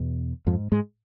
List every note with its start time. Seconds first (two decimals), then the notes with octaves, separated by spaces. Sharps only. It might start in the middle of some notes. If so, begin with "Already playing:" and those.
Already playing: E2 B2
0.47 F2 G#2 F3
0.72 G#2 G#3